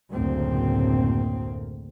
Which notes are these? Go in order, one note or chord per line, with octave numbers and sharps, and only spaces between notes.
F#1 D2 A2 A#3 C4